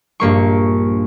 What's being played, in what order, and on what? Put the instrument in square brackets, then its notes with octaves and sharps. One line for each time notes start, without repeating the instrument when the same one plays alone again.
[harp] A#1 G2 A#3 C#6